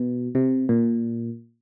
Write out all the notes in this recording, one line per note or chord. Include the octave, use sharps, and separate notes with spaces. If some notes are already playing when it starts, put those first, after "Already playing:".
Already playing: B2
C3
A#2